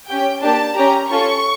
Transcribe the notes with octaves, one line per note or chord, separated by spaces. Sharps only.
C#4 G4 G5
A#3 D4 G4 A5
C#4 G4 A#5
C#4 F4 A4 C#6